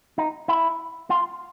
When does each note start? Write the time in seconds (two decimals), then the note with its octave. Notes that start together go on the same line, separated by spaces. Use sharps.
0.18 D#4
0.48 E4
1.10 F4